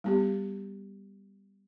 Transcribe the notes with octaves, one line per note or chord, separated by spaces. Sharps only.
G3 B3 G4